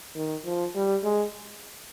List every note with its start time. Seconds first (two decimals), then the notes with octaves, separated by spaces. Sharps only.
0.15 D#3
0.45 F3
0.75 G3
1.04 G#3